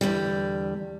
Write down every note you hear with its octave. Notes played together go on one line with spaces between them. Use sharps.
E2 G2 D3 G3